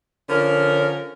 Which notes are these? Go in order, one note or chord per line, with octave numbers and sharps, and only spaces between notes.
D3 F3 C#4 A#4